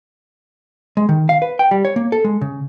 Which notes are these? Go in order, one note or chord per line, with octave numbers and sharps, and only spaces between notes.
G#3
D#3
F5
B4
G5
G3
C#5
A#3
A4
G#3
C#3